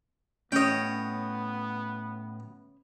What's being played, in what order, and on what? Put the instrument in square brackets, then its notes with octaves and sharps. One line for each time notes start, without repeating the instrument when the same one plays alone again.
[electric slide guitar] A2 [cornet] B3 [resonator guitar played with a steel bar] C#4 C#5 [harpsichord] D#5 G5